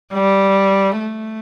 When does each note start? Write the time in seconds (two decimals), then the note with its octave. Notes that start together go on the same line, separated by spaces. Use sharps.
0.13 G3
1.00 A3